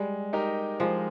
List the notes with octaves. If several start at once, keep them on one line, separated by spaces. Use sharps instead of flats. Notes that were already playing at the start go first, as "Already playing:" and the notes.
Already playing: G3 G#3
D#4 G4 A#4
F3 G#3